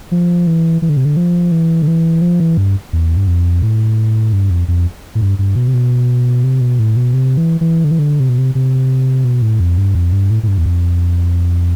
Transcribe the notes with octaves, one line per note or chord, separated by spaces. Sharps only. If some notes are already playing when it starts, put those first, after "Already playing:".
F3
E3
E3
D3
C3
D3
F3
E3
D3
E3
F3
E3
G2
E2
G2
F2
A2
G2
F2
F2
A2
G2
G2
B2
C3
B2
C3
B2
A2
B2
C3
E3
E3
D3
E3
D3
C3
B2
C3
C3
B2
A2
F2
G2
F2
G2
A2
A2
G2
E2
F2